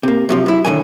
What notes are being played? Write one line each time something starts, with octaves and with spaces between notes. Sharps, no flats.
C3 A#3
F#2 C3 F3
F#2 E4
A2 D3 D#3 A3 G#5